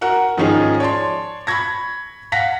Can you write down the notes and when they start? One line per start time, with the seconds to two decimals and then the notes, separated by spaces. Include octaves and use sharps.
0.01 F#4 A#4 F#5 A#5
0.37 G#2 D#3 F3 C#4 D#4 G#4
0.80 C#5 D5 A5 C6
1.47 B5 C#6 G#6 A#6
2.32 F5 F#5 A#6 B6